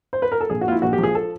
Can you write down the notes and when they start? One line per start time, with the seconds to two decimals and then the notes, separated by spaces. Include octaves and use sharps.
0.13 C5
0.22 B4
0.32 A#4
0.40 A4
0.50 A#1 G#4
0.61 F#4
0.67 A#2 F4
0.71 E4
0.82 A#1 F#4
0.93 G4
0.98 F3
1.03 G#4
1.15 A4